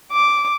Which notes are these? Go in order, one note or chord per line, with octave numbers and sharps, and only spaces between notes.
D6